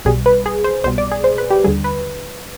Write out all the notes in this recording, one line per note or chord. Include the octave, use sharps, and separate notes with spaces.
B1 B2 G3 G#4
B4
G#4
C5
C2 B2 G3 C5
D5
G#4
C5
B4
G4
D#2 D3 G3 G#4
B4